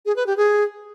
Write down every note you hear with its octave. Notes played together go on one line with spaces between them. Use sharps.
G#4
B4
G4
G#4